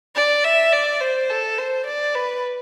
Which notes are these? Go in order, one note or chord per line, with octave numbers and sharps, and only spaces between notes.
D5
E5
D5
C5
A4
C5
D5
B4